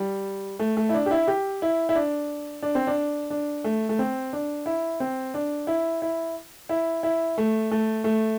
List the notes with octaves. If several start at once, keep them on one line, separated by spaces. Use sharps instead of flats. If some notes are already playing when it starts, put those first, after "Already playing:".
Already playing: G3
A3
A3
E4
D4
G4
E4
G4
E4
E4
D4
D4
C4
D4
D4
A3
A3
C4
D4
E4
C4
D4
E4
E4
E4
E4
A3
A3
A3